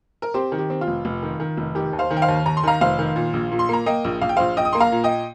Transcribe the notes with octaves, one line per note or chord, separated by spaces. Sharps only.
A#4
C4 G4 C5
D#3
G4
C4
F4
F1
F1
D#3
D#3
F1
D#3 G4
D#2
C5 F5
D#3
G5
C5 F5
D#2
D#2 A#5
C6
D#3 F5 A#5
F1 C5 F5
D#3
A#2
A#1
A#2
C6
A#3 A#5
A#3 D#5 G5
A#1
A#1 F5
G5
A#1 C5 F5
A#1 D#5 G5
D#6
A#3 C6
F5 A#5
A#2
D#5 G5